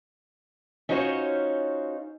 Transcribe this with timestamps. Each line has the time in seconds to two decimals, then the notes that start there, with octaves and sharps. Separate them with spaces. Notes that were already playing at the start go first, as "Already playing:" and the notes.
0.89 C#4 D#4 F4 F#4 C5 C#5